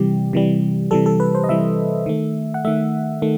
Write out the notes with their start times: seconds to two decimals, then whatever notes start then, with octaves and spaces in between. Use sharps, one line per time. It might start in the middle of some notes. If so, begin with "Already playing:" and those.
Already playing: C3 E3 G3 G4
0.33 C3 E3 G3
0.91 C3 E3 G3 A4
1.06 A4
1.20 B4
1.35 C5
1.44 D#5
1.49 C3 E3 G3 E5
2.06 D#3 A3
2.54 F#5
2.65 D#3 A3 E5
3.22 D#3 A3